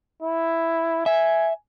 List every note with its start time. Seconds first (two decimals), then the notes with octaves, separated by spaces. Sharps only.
0.23 E4
1.06 E5 G#5